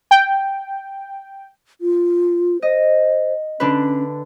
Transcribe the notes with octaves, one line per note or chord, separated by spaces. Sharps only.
G5
F4
C5 D#5
D3 C#4 D4 B4